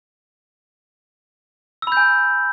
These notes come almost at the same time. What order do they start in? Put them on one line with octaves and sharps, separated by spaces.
E6 B5 G6 G#5